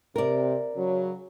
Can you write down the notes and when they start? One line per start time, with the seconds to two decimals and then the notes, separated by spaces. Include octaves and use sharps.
0.16 C3 A#4 D5
0.76 C#3 F#3